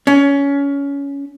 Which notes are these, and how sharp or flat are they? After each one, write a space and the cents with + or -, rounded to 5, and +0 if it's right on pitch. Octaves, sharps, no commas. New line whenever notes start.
C#4 +20